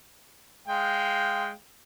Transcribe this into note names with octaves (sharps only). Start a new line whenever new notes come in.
G#3 F5 G5